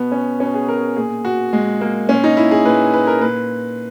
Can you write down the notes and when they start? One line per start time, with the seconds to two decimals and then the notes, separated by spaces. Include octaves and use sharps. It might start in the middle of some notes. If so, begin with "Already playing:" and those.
Already playing: B2 B3
0.12 C#4
0.40 B2 C#4
0.54 G#4
0.68 A#4
0.97 A#2 G#4
1.25 F#4
1.53 A#2 G#3
1.81 A#3
2.09 A#2 C#4
2.24 D#4
2.37 E4
2.51 G#4
2.65 A#2 B4
2.94 B4
3.07 A#4
3.21 A#2 B4